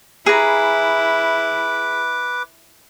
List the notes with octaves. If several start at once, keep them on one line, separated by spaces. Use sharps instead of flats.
E4 G#4 B4 A#5 D6